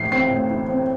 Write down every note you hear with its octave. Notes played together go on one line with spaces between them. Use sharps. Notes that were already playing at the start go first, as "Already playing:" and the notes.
Already playing: A2 E3 C7
C4 C7
A2
E3
C4